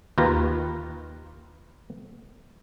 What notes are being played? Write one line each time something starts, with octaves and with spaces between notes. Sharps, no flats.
D#2 D#3 F4 B4 A#5